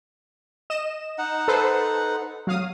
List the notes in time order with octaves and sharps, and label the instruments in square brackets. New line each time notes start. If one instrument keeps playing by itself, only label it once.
[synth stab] D#5 E7
[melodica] D#4 F#5
[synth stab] A4 B4 C5
F#3 F5 D#6